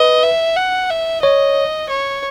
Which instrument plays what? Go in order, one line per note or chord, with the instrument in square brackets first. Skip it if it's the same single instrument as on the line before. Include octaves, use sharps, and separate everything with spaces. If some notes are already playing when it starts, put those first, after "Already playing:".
Already playing: [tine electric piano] B4 [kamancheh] D#5
[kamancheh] E5
F#5
E5
[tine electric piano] C#5 [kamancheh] D#5
[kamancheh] C#5